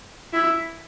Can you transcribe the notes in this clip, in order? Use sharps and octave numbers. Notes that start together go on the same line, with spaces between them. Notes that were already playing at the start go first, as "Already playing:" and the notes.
E4